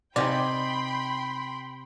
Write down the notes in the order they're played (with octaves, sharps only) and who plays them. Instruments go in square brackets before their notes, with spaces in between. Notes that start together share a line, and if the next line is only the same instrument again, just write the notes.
[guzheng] C3 G#5 [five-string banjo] D#4 G4 D5 [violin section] G5 B5 C6